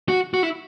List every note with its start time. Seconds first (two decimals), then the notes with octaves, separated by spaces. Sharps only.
0.09 F#4
0.34 F#4
0.43 E4